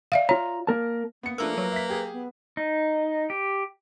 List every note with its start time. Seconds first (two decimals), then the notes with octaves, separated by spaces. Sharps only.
0.12 D5 E5 F5
0.29 F4 C#5 A#5
0.67 A#3 A#4 A5
1.23 A#3 B3 C#7
1.38 F3 A3 A#3 D4 A#4 B4 E6
1.58 F#3 B4
1.72 E5 B6
1.89 G4 G#4
2.12 B3
2.57 D#4
3.30 G4